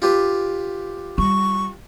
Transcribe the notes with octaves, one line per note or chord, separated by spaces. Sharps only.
F4 G4 B4
G3 C#6